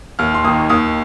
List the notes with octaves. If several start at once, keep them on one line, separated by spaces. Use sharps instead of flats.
D#2 F6
C6
D#3 A#3 D#6
D#2 D#6